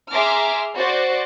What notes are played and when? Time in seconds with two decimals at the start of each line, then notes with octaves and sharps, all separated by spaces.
0.11 G#4 E5 A#5 C6 D6 F6
0.77 F#4 C5 D5